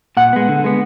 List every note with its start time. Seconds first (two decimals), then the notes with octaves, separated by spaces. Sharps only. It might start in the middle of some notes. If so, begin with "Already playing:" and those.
0.17 A#2 F#5
0.33 G#3 B3
0.49 D3
0.64 G#3 B3